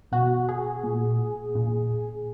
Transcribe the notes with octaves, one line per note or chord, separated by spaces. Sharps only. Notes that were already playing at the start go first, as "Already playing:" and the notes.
B2 F#4
G#4
A#2
A#2